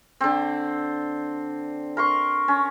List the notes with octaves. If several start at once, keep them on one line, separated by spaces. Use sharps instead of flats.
D3 C4
A#4 C6 C#6
C#4